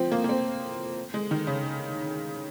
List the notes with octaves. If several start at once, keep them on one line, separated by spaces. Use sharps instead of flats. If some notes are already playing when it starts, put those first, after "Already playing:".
Already playing: F3 C4
A#3
A#3
C4
G#3
D#3
C#3